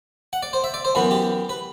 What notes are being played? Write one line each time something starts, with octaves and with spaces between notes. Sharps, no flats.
F#5
D5
C5
E5
D5
C5
F#2 E3 B3 B4
G4
B4